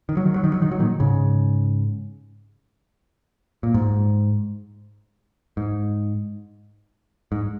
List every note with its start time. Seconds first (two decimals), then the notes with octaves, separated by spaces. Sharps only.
0.09 D#3
0.17 F#3
0.26 D#3
0.36 F#3
0.44 D#3
0.54 F#3
0.62 D#3
0.71 F#3
0.79 A#2 D#3
1.00 G#2 C#3
3.63 A#2
3.74 G#2
5.57 G#2
7.32 G#2